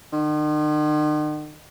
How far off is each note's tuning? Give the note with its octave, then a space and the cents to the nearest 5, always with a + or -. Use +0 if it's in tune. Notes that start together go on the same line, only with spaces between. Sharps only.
D#3 -45